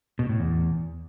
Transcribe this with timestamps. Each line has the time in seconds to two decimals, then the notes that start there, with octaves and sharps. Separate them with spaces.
0.19 B2
0.29 A2
0.40 E2